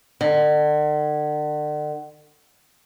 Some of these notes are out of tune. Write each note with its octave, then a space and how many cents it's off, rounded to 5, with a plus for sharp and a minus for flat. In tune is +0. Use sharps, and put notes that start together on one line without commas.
D3 +40